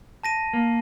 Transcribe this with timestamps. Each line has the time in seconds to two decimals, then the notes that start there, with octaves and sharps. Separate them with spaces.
0.23 A5 A#6 D#7
0.53 A#3